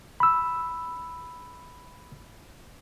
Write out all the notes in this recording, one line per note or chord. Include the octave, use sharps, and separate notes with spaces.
B5 E6